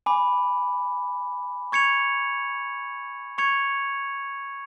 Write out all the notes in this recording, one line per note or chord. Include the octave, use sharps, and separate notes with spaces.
G#5 B5 D6
C#6 G#6 C#7 F7
C#6 G#6 C#7 F7